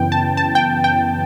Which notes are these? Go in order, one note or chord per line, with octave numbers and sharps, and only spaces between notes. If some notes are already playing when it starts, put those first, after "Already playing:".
Already playing: F#2 C#3 E3 B3 G5
A5
A5
G5
G5